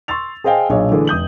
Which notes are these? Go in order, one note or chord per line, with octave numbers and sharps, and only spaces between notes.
C6 C#6 E6 A6 F7
G#4 C5 D#5 F5 G5 G#5
B1 A#2 D4 G#4 C#5 D#5
D3 E3 A3 D4 G#4
F1 D#6 G6 F#7